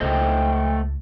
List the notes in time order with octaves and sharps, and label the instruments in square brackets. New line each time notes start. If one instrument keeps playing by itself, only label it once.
[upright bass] C#2 [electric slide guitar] A3 C5 D#5 [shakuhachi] G5